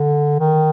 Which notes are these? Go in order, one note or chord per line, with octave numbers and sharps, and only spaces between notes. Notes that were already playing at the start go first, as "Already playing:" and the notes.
Already playing: D3
D#3